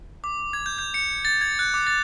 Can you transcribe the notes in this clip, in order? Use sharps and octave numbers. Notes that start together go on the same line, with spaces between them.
D6
G#6
G6
G6
C#7
A6
G#6
F#6
D6
A6